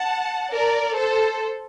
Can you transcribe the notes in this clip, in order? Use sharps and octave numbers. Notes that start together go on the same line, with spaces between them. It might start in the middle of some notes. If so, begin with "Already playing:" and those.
Already playing: F#5 A5
A#4 D5
A4 C5